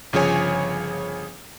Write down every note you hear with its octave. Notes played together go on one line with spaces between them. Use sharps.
G1 C#3 F3 G#4 C#5 G#5